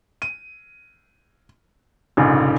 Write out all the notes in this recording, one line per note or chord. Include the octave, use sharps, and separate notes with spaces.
D#7
F1 A#1 G#2 C#3